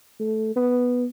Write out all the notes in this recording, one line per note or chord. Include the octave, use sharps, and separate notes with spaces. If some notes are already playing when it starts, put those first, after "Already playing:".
A3
B3